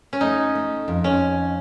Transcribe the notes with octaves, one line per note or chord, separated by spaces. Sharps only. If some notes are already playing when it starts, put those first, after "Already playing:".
C#4
A3 D#4
A3
F2
C#4